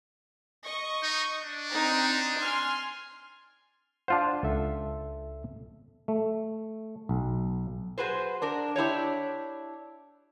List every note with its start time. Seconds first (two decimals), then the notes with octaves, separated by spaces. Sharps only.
0.66 D#5 C#6
1.03 D#4
1.40 D4
1.72 C4 D#4 A#5
2.39 G#5 C6 F6
4.08 D4 F4 C5 F#5 A5
4.43 C#2 A4 E5
6.08 A3
7.09 B1
7.98 F#4 G#4 B4 C5
8.42 D4 A#4
8.76 D4 E4 G4 C#5